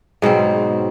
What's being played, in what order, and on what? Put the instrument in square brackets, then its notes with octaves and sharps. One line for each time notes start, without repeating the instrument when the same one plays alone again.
[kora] G#2 B2 F#3 C4